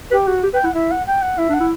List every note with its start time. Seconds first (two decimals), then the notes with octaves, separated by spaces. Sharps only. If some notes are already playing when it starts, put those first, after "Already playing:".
0.11 G4 B4
0.27 F#4 G4
0.43 G4
0.53 B4 G5
0.64 E4 F#5
0.74 E4 E5
0.91 F#5
1.07 G5
1.22 F#5
1.38 E4 E5
1.49 D4 F#5
1.60 E4